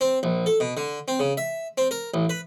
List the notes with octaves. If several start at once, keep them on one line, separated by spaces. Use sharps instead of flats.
C4
A#1
A4
B2
D3
C4
C#3
E5
C4
A#4
A1
B4